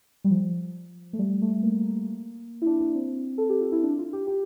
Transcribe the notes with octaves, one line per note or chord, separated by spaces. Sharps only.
G3
F3
A3
G3
A3
A#3
E4
D4
D4
C4
A4
G4
F4
E4
D4
F4
G4
G4